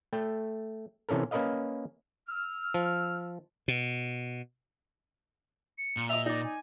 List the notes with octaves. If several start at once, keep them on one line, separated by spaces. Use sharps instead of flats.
A3 G5
C3 E3 C#4 A4 A#4
A#3 C#4 A#4 B4 D#5 F5
E6 F6
F3
B2
C#7
A#2
D#5 E5 F7
D#4 D5 A#6
G#5